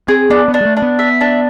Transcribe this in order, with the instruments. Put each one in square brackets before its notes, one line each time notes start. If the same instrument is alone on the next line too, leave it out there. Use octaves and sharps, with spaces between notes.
[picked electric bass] C4 [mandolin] G#4
[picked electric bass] B3 [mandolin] D4
[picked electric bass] B3
[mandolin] D4
[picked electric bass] G#3
A3
[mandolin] D4
[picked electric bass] B3
[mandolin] E5
D4